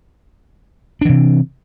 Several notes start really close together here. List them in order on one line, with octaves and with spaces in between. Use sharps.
D4 E3 C3